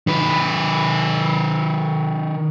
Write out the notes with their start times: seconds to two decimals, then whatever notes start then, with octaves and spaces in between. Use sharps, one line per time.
0.07 D#3 B4